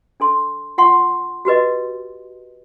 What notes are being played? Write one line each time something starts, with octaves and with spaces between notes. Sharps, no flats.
D4 A4 C6
F4 F#5 C6 C#6
F#4 G4 B4 D#5